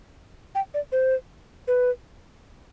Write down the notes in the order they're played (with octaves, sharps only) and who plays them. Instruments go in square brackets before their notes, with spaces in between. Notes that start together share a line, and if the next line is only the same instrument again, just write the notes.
[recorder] G5
D5
C5
B4